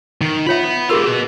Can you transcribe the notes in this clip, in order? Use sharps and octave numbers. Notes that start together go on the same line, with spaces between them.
D#3
F4 C#5 E5 F#5 B5
F4 G4 G#4 A#4 E6
F#4 B4